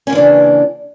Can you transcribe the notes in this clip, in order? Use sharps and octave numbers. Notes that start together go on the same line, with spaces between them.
C#3 E3 A#3 C#4 D4